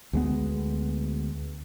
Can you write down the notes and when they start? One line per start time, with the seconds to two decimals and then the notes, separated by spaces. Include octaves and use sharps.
0.13 D2 G#3 B3